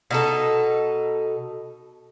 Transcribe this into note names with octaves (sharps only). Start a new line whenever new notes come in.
B2 D#4 A4